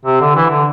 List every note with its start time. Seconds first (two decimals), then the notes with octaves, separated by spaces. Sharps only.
0.05 C3
0.20 D3
0.36 E3
0.50 D3